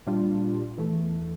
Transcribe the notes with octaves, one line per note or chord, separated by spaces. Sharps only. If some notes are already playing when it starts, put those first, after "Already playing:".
A#2 G3 D4 F4
E2 E3 A3